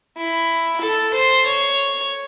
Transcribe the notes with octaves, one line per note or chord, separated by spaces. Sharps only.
E4
A4
C5
C#5